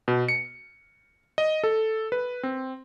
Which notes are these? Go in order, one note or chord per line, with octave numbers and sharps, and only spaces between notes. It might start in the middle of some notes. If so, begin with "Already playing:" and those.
B2
C#7
D#5
A4
B4
C4